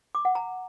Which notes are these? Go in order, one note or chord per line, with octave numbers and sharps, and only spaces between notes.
D6
F#5
A#5